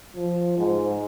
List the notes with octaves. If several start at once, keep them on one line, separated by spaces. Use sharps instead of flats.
F3
G#2